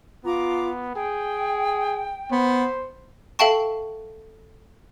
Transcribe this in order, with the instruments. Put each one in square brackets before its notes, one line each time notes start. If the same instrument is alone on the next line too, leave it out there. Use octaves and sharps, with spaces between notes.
[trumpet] B3 [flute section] F4 A#5 D6
[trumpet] G#4 [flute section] G5
[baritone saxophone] B3 [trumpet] C5
[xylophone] A4 E5 F5 G5 A5 C#6